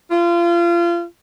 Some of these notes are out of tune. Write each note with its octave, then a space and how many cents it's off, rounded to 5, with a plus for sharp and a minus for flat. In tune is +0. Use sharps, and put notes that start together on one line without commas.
F4 -30